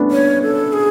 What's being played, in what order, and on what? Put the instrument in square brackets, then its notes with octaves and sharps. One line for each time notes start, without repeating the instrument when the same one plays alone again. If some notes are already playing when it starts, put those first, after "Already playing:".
Already playing: [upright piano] A3 B3 C#4 D4
[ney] C#5
A4
G#4